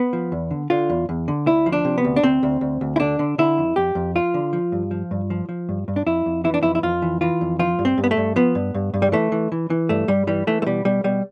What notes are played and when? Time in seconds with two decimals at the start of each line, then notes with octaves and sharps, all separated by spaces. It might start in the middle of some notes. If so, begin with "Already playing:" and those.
Already playing: B3
0.13 F3
0.32 E2
0.51 D3
0.70 D3 F4
0.90 E2
1.09 E2
1.28 D3
1.46 D2 E4
1.66 F3
1.72 D4
1.85 C3
1.98 B3
2.04 D2
2.16 D4
2.23 D2 C4
2.43 D2
2.61 D2
2.81 D2
2.96 E4
3.00 D3 D4
3.19 D3
3.38 D3 E4
3.58 F2
3.76 F2 G4
3.95 F2
4.15 F3 F4
4.34 D3
4.53 F3
4.72 G2
4.91 F3
5.11 G2
5.30 F3
5.49 F3
5.69 G2
5.88 G2
5.96 D4
6.06 F2 E4
6.26 F2
6.44 E3 E4
6.54 D4
6.63 F2 E4
6.75 E4
6.83 F2 F4
7.02 E3
7.21 E3 F4
7.41 F2
7.59 F3 F4
7.79 G2
7.85 C4
7.98 G2
8.04 B3
8.11 A3
8.17 G2
8.36 F3 B3
8.55 G2
8.75 G2
8.94 G2
9.02 G3
9.12 E3 A3
9.32 E3
9.52 E3
9.70 E3
9.89 G2 A3
10.08 G2 G3
10.27 E3 G3
10.47 E3 A3
10.62 A3
10.66 B2 G3
10.85 B2 G3
11.04 B2 G3